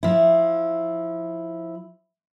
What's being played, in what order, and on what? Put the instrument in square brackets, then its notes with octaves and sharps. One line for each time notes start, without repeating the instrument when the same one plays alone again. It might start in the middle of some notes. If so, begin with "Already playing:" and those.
[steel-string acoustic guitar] F3 E4